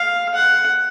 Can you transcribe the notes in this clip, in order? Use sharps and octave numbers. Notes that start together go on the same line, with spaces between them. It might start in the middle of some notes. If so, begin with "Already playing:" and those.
Already playing: F5
F#5